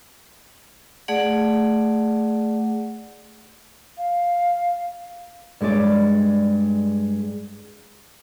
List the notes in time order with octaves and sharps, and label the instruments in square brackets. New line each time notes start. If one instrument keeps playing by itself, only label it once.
[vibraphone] A3 G#4 D5 F#5
[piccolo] F5
[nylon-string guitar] G2 G#3 C#5 D5